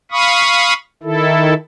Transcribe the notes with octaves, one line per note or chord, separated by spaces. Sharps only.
F5 B5 C#6 D#6
D#3 E4 A4